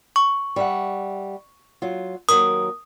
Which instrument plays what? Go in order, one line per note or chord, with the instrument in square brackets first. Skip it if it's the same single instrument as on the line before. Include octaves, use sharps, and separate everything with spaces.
[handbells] C#6
[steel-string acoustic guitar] G3 E5 F#5
F#3 F4
[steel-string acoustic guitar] D#2 F#3 A#4 [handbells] D#6